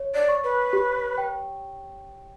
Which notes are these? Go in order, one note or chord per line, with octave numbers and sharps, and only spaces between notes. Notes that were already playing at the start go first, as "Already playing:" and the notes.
Already playing: C#5
D5
C#6
B4
G4
G5